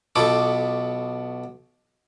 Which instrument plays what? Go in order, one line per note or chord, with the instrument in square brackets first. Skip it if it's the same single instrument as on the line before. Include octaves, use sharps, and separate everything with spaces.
[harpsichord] B1 B2 B3 F4 A4 D6